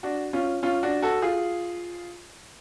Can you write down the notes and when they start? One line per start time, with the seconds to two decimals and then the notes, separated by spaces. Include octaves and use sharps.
0.03 D4 F#4
0.33 C#4 F4
0.63 C#4 F4
0.83 D4 F#4
1.02 F#4 A4
1.22 F4 G#4